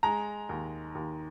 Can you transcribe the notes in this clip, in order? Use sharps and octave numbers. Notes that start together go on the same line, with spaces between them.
G#3 A#5
D#2
D#2